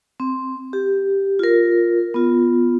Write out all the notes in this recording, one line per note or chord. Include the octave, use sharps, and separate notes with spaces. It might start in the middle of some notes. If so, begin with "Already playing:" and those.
C4
G4
F4 A#4
B3 F4